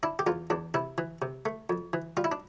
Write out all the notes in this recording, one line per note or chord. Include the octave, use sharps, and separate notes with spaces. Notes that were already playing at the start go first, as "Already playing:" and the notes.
D4 E4
G4
E2 F4
E2 D4
C3 E4
E3
C3
A3
F2
E3
G3 F4
E4
D4